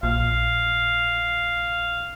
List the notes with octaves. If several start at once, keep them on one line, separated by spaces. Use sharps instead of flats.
A#1 F5